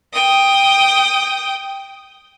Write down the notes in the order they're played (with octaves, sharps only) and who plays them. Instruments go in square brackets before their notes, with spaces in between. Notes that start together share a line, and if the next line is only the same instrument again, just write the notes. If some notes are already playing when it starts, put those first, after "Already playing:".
[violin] G5 D#6